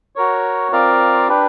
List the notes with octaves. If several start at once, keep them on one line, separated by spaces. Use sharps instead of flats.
F#4 A#4 C#5
C4 F4 A#4 D5 F5
D4 G4 B4